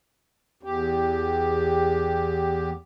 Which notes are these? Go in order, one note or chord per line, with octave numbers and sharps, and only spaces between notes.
E2 G4